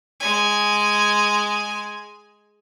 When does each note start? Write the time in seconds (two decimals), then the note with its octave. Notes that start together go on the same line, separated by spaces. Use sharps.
0.20 G#3 G#5